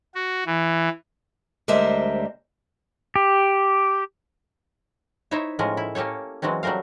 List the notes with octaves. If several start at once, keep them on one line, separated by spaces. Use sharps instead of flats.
F#4
E3
D2 G3 G#3 A#4 C5 E5
G4
D#4 E4 C5 C#5 E5
A2 F3 G#3 C#4 A#4
E4
A#3 C#4 G4 A4 C#5
E3 F#3 G#3 C4 C#4
F#3 G3 A3 A#4 F5